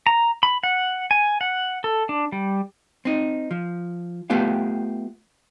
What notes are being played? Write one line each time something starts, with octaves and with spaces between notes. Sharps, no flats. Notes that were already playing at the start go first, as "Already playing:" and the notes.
A#5
B5
F#5
G#5
F#5
A4
D4
G3
C4 D#4
F3
A3 B3 F4 G4 F5